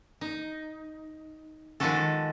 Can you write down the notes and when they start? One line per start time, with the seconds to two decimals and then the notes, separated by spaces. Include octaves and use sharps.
0.21 D#4
1.80 D#3 F3 G#3 F#4 A4